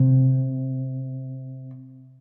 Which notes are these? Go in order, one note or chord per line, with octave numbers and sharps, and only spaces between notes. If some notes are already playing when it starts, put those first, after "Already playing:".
Already playing: C3